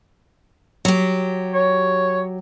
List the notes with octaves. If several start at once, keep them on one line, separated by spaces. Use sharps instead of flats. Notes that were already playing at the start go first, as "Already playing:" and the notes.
F#3 G4
C#5